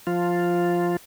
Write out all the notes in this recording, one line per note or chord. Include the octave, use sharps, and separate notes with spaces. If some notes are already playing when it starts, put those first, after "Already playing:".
F3 F4